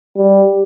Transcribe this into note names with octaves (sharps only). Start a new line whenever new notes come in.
G3